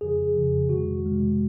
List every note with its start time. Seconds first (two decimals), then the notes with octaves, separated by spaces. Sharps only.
0.01 F2 C#3 F3 G#4
0.35 F2 C#3 F3
0.69 F2 C3 D#3 G#3 F#4
1.03 F2 C3 D#3 G#3